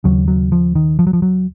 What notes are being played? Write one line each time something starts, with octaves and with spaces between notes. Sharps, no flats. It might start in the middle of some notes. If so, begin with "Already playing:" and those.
D#2 C#3 F#3
F#3
F3
D#3
F3
F#3
F3
F#3